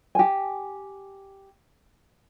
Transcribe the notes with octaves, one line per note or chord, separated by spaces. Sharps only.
G4 G#5